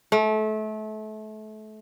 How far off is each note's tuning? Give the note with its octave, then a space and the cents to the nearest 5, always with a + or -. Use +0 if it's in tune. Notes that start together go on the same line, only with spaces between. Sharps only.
A3 -30